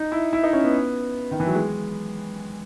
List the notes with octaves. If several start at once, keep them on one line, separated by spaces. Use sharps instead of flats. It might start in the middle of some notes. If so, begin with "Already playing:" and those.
Already playing: D#4
E4
E4
D#4
C#4
B3
D#3
E3
F#3
G#3